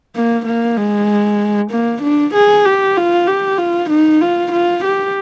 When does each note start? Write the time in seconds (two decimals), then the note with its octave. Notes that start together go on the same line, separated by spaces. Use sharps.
0.15 A#3
0.45 A#3
0.76 G#3
1.71 A#3
2.02 D4
2.34 G#4
2.65 G4
2.96 F4
3.27 G4
3.58 F4
3.90 D#4
4.21 F4
4.52 F4
4.84 G4